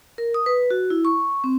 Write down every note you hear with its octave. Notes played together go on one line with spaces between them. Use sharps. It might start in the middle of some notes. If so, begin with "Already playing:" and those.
A#4
D#6
B4
F#4
E4
C#6
C4